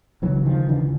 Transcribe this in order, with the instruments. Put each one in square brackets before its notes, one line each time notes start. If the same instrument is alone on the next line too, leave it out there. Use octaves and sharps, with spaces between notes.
[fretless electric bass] E1 D#2 C#3 E3 F#3
D#3 F3
D3 E3